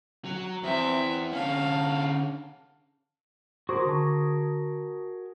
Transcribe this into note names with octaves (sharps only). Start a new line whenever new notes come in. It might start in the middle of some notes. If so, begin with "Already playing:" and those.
F#3
E2 C4 E5
D3 C#4 F5 A5
F#4 G#4 A#4 C5 C6 D6
D3 A5 C#6